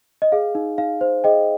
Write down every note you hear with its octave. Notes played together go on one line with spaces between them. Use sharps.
D#5
G#4 F5
D#4
D#4 F5
C5
G#4 D#5 G5